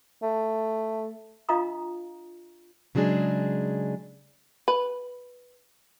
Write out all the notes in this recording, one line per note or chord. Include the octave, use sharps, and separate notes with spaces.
A3
D4 F4 D#5 F5 A#5 D#6
C#3 F#3 G#3 D4 G#4
B4